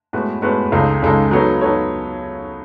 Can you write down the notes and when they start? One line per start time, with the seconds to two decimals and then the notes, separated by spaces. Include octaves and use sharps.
0.13 A2 G#3 B3 F#4 B4
0.42 A2 G#3 B3 F#4 B4
0.72 C#2 C#3 G#3 D#4 A4
1.02 C#2 C#3 G#3 D#4 A4
1.31 F#3 B3 D#4 A4 C#5
1.61 F#3 B3 D#4 A4 C#5